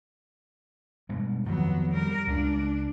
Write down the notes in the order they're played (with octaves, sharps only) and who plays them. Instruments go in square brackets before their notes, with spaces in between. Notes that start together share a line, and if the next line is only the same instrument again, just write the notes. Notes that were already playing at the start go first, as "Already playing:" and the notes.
[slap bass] G2 B2 G#3
[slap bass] F2 D#3 F3 [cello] F#3 B3
[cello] G3 A#4
[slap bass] C#2 C#3 G#3 [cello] D4